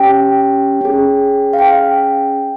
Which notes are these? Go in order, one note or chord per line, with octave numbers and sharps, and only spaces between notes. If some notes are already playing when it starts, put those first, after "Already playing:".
Already playing: C#4 G4 G5
C#4 G#4
F5
G5